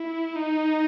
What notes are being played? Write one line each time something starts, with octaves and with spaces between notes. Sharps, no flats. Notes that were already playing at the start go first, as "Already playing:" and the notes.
Already playing: E4
D#4